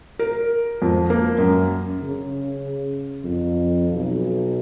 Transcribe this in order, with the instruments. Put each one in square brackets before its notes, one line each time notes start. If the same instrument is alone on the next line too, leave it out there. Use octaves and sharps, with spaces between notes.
[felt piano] A#4
F2
A#3
F#2
[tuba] C#3
F2
B1